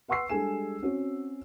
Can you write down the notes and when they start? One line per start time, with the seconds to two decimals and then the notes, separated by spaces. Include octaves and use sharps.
0.08 B4 F#5 C6 C#6 E6 C7
0.29 G3 G#3 D4 A4 G#5 E7
0.82 C4 C#4 F#4